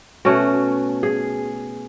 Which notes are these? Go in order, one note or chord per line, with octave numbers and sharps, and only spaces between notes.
B2 A3 C#4 F#4
G#4